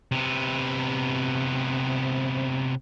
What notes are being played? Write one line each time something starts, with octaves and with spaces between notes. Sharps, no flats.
C3 B3